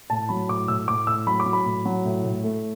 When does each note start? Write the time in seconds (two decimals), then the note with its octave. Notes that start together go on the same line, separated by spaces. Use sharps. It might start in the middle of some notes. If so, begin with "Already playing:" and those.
0.10 A2 A5
0.29 F#3 B5
0.49 A2 D6
0.68 A2 E6
0.88 A2 D6
1.07 A2 E6
1.27 F#3 B5
1.40 D6
1.46 F#3
1.53 B5
1.66 A2
1.85 F#3
2.05 A2
2.24 A2
2.44 A3